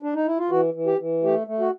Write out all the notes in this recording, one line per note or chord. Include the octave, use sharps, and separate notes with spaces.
D4
D#4
E4
F4
E3 F#4
E3
G4
E3
A3 G4
A3
F#4